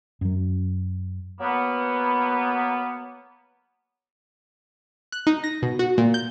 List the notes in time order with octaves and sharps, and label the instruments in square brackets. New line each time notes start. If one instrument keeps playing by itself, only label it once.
[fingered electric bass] F#2 F#3
[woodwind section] F#3 A#3 B3
[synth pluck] F#6
D#4
A#6
B2
F#4
A#2
G6